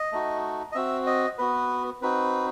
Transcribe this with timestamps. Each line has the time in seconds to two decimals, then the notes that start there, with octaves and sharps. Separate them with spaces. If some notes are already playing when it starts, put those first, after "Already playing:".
Already playing: D#5
0.12 A3 D#4 F#4
0.72 D#5
0.75 C4 F#4 E5
1.07 D#5
1.38 B3 F#4 B4
2.02 C4 D#4 F#4 B4